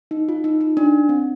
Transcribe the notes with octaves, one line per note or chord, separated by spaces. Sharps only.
D#4
F4
D#4
D#4
D4
C4